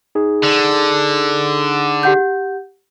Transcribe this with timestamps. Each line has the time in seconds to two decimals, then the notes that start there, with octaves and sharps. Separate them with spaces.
0.15 D#4 G#4
0.43 D3
2.03 G4 F#5 G6